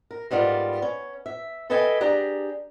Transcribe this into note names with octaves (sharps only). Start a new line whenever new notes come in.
A#4
G#2 G3 B3 F4 A#4
C#4
E5
A4 B4 D#5 E5 G5 G#5
D4 G4 G#4 A#5